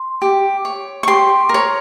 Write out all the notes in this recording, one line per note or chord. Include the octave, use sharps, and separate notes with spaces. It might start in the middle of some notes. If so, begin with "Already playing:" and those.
Already playing: C6
G4
C#5
C#6
G4 C6
A#4 C#5